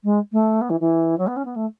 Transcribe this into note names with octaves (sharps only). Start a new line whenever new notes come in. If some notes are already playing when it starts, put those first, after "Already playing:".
G#3
A3
B3
E3
E3
F#3
B3
C#4
B3
A3